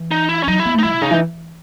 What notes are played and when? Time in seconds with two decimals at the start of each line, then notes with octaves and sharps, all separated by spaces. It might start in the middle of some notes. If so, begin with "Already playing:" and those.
Already playing: E3
0.11 D#4
0.29 E4
0.43 C#4
0.47 F#3 D#4
0.60 E4
0.65 B3
0.74 A3
0.79 D#4
0.83 G#3 E4
0.92 B2
1.01 C#3 D#4
1.11 E3